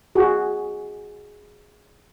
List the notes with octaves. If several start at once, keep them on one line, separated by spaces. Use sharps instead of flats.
F#4 G#4